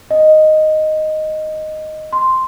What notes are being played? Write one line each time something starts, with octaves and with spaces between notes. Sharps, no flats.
D#5
C6